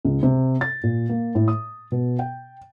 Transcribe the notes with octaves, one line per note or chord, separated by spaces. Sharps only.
C#2
C3
A6
A#2
A#3
A2
D#6
B2
G5